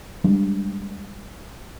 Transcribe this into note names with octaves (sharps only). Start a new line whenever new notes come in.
G3 G#3 D4